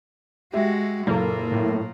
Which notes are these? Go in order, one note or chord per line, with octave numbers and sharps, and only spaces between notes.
G#3 F#4 G4 E5
F#1 A#2 A#3 A4
A2